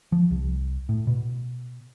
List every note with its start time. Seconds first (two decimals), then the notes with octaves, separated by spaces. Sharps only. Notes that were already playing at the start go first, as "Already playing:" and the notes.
0.12 F3
0.31 C2
0.89 A2
1.07 B2